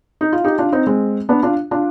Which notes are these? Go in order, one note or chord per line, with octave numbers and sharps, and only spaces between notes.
D#4
F4
D#4 G4
D4 F4
C4 D#4
G#3 C4
B3 D4
D4 F4
D4 F4